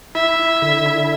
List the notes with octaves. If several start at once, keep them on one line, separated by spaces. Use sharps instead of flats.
E4 E5
E4
D3
E4